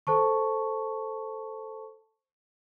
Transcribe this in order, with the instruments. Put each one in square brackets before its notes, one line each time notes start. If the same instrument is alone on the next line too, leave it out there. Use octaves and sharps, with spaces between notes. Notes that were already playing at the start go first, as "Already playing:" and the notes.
[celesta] A4 C5 A5 C#6